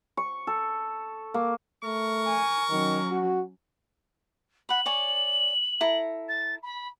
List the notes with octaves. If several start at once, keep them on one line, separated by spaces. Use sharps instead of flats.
C#6
A4
A#3
A3 A#4 C#6
G#5
D#3 F#3 C#4
F#4
F#5 B5 F#7
C#5 D5 G#5
E4 A4 A#5
A6
B5